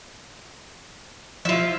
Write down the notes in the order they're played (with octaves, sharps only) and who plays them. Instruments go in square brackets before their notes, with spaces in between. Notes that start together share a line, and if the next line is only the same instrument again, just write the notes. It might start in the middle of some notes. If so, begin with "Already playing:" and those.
[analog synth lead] F3 [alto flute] E4 [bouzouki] F4 E5